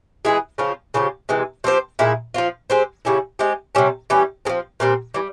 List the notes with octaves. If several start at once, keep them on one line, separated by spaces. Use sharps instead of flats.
E3 G#3 E4 G#4
C#3 F3 C4 F4
C#3 F3 C4 G4
C3 E3 G#3
F3 C4 G4 C5
A#2 G#3 E4
F3 C4 F4
G#3 C4 G4 C5
C#3 G3 C#4 E4
G#3 C4 G4
C3 G3 C#4
E3 G3 C#4 G4
F3 G#3 C4
A#2 G3 C4
E3 G3